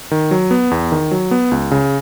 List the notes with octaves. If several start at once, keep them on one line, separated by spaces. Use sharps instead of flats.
D#3
F#3
B3
E2
D#3
F#3
B3
C#2
C#3